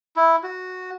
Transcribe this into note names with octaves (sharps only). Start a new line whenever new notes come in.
E4
F#4